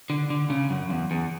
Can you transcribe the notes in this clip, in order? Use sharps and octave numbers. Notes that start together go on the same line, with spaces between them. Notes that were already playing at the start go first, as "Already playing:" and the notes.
D3
D3
C#3
F#2
E2
E2